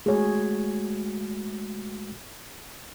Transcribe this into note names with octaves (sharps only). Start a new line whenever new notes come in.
G#3 A3 F#4 G#4 C#5